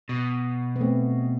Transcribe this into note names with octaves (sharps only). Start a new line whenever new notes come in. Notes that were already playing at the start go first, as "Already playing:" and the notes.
B2
B3
A3 C4